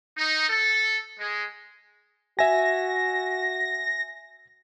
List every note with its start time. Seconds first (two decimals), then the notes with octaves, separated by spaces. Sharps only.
0.17 D#4
0.49 A4
1.19 G#3
2.39 F#4 E5 G#5 A#6